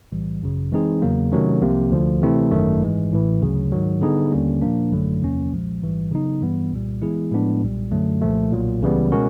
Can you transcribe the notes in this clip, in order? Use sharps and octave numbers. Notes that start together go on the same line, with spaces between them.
B1 A2 E3 G3
G#1 F#2 C#3
E3 G#3 C4 D#4 G#4
E2 C#3 F#3 A#3
C3 D#3 F#3 A3 C#4
C2 C3 F3 A#3
D2 D3 F3
C3 E3 A3 C4 E4
G#1 F#2 D#3 F#3 A3
G#2 E3 G#3
A1 A2 E3
D2 C#3 F#3
G#2 D#3 F#3
D3 G3 B3 D#4 G#4
D#2 D3 G3 A#3 C#4
A#2 F3 A#3 D4
G#1 F#2 D3 F#3 A3
E2 C3 F3 A#3 C#4
B1 A#2 F3 G#3
A1 G#2 E3 G3
C#3 F#3 B3 D#4
G2 E3 G3 B3
C2 A#2 G3
E3 G#3 B3 E4 G#4
A2 F3 G#3 B3 D4
B1 A#2 G3
F#2 D3 F#3 A3
C2 A#2 F3 A3
B1 A#2 F#3
C#2 C#3 E3 G3 B3
B2 G#3 C#4 F#4 A#4